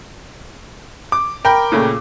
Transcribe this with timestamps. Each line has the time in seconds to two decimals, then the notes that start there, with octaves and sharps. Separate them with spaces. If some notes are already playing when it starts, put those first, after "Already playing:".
1.12 D6
1.45 A#4 G5 B5
1.72 A#2 C#3 A3